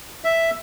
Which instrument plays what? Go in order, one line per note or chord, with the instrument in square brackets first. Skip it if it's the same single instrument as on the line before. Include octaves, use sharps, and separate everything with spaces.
[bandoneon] E5